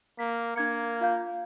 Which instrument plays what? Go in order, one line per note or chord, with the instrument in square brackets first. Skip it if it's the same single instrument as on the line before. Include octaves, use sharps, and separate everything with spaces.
[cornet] A#3 [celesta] B6
[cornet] A#3 [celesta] D4 G#6 C#7
[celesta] F4 F5 G6